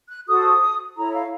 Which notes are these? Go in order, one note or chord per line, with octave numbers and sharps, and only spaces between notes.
F#6
F#4 A4 C5 D#6
E4 A4 C#5 A#5
F5